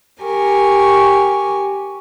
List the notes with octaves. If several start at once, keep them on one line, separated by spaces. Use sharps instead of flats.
G4 A#4 G#5 C#6